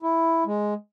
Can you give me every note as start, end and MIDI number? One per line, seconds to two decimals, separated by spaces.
0.03 0.44 64
0.46 0.74 56